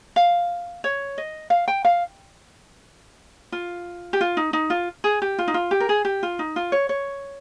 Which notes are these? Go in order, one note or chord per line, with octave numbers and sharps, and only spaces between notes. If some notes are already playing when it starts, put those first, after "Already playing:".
F5
C#5
D#5
F5
G5
F5
F4
G4
F4
D#4
D#4
F4
G#4
G4
F4
D#4
F4
G4
A#4
G#4
G4
F4
D#4
F4
C#5
C#5